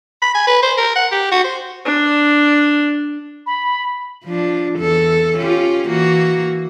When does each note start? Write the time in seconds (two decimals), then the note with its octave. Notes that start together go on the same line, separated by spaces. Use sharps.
0.22 B5
0.35 G#5
0.47 B4
0.63 C5
0.78 A#4
0.96 F#5
1.12 G4
1.32 F#4
1.45 C5
1.85 D4
3.46 B5
4.24 F3 D4
4.78 E2 A4
5.36 C#4 F4 G4
5.89 E3 A#3 F#4